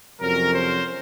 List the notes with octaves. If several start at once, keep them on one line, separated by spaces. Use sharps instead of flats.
F2 C3 F#3 C#4 A#4
C5